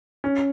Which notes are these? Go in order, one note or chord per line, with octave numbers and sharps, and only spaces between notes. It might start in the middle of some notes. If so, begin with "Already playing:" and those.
C#4